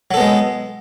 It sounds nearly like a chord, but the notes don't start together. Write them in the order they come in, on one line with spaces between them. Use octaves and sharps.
F#3 A4 B3 G#3